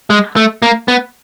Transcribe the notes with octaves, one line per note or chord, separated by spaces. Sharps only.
G#3
A3
A#3
B3